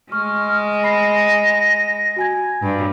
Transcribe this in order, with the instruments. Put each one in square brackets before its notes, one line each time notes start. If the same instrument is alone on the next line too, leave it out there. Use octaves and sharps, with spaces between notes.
[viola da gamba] G#3 [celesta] C#6 [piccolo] F6
[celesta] B5 C7 [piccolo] A#6
[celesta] F#4 G#5 G#6
[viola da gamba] G2 [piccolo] B5